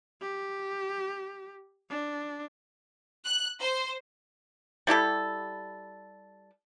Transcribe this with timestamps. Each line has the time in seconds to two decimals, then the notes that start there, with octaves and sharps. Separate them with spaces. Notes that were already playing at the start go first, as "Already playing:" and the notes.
0.22 G4
1.90 D4
3.25 F#6
3.60 C5
4.87 G3 E4 G4 A4